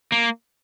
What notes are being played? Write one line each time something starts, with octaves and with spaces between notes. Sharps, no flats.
A#3